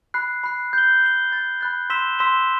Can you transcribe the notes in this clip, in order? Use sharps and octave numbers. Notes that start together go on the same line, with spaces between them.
B5 F#6 C7
B5 F#6 C7
G6 C7 G7
G6 C7 G7
B5 F#6 A6
B5 F#6 A6
C6 E6 B6 E7 G7
C6 E6 B6 E7 G7